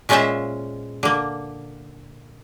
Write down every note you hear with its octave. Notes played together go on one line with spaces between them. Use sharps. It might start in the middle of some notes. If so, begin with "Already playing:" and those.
A#2 G#3 C#4 F4 C5 E5
D3 A#3